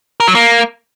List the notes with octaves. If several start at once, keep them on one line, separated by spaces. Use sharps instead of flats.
A#4
F#3
A#3